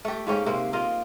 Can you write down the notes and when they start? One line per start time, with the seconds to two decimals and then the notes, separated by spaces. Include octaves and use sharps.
0.05 A3 G4
0.27 G#2 A#3 C#4 G4
0.46 C3 A#3 C5
0.73 A#3 F4 D#5